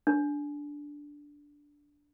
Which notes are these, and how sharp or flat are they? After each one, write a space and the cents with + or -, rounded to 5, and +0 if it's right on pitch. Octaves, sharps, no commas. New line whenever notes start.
D4 -5